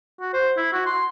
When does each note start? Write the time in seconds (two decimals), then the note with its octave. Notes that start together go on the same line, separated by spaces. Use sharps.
0.20 F#4
0.34 C5
0.57 E4
0.73 F#4
0.86 C6